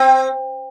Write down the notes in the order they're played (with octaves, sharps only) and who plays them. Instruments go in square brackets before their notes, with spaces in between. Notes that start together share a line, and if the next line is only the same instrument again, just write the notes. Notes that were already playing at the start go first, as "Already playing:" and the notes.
Already playing: [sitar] C4